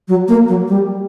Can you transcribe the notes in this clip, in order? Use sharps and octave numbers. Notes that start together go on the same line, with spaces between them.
F#3
A#3
F#3
G3